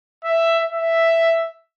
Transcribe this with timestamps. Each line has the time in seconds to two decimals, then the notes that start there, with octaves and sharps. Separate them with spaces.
0.24 E5
0.72 E5